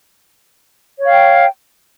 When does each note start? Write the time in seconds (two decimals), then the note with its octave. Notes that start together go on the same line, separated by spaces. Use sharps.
1.00 C#5
1.05 F5
1.10 G5